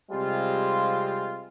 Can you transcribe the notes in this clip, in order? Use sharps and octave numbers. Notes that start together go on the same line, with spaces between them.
C3 G3 G#3 C4 F4